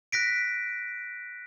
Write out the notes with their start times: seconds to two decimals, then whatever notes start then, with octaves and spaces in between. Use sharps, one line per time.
0.12 F#6 A#6 B6 D7